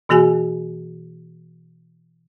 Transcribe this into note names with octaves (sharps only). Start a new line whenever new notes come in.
B2 E3 A#3 F#4 G#4 G#5